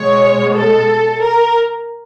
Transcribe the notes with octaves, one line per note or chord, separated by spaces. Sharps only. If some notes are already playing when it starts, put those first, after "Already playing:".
Already playing: B2 G#3 C#5
A4
A#4